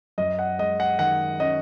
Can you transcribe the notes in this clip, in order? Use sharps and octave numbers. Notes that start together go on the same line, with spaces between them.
F#2 D#5
F#5
G#3 D#5
F#5
D#3 F#5
C#4 D#5